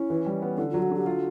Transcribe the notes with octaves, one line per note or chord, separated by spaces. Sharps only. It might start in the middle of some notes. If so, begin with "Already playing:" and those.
Already playing: C#4 E4
E3
G3
B3
D3 E4
F4
F#3
F#4
D3 G4
F4 F#4